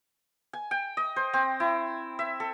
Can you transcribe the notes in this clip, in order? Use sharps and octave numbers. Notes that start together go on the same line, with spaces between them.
G#5
G5
D#5
C5
C4
E4
E5
A4